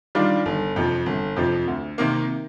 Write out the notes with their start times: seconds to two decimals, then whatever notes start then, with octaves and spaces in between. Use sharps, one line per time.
0.15 D#3 G3 D4 F4
0.46 G1
0.76 F2 C3 F3
1.06 G1
1.36 F2 C3 F3
1.68 D2
1.98 C3 D#3 A#3